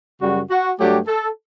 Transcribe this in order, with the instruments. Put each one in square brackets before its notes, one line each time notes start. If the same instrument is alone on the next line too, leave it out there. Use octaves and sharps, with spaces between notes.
[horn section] F#2 C#3 G3 F#4
F#4
G2 F#3 A3 D4 G4
A4